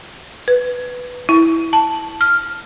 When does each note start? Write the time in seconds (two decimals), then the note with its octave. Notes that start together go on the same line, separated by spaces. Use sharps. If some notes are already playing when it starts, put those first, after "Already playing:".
0.48 B4
1.29 E4
1.73 A5
2.21 F6